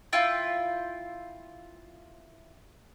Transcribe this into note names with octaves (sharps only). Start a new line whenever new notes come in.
E4 F4 G5